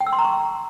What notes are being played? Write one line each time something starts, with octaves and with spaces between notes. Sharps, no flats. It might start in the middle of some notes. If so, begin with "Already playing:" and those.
G5
E6
C6
A#5
C#6